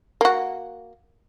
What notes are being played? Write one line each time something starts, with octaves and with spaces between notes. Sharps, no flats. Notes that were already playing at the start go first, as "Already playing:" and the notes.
A#3 F#4